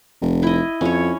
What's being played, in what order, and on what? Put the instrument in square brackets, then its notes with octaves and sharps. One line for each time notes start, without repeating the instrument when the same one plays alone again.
[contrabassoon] F1
[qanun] E4 D#5
[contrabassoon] F2 [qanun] C#4 C#5